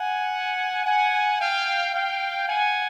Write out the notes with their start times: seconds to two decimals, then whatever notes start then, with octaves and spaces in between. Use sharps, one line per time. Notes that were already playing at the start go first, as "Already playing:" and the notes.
Already playing: F#5 G#5
0.85 F#5 G#5
1.39 F5 G5
1.94 F5 G5
2.48 F#5 G#5